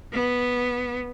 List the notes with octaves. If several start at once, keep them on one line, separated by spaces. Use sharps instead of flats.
B3